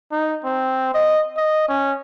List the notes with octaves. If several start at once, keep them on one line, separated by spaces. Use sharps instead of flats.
D#4
C4
D#5
D#5
C#4